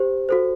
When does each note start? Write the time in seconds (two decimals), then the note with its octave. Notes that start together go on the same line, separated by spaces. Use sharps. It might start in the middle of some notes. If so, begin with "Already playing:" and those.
Already playing: G4 C5
0.29 F#4 A4 C5